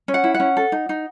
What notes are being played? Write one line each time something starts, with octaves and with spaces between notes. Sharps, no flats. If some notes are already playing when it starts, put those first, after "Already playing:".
C#4
F#5
E4
F#5
C#4
A4
D#4
D#4